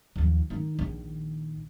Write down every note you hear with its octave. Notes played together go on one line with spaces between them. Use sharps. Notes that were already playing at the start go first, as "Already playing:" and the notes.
D#2 F3
D#3 D#4
A#1 D#3